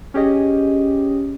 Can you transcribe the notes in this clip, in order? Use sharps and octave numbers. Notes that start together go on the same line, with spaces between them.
C#4 G4 G#4 D#5